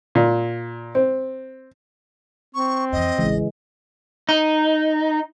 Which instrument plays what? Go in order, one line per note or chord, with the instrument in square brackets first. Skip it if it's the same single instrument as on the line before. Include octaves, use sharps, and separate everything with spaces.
[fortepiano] A#2
C4
[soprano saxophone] C4 [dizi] C#6
[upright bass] F2 E3 [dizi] D#5
[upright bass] D1 A1 [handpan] C#3 E3 G#3
[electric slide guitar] D#4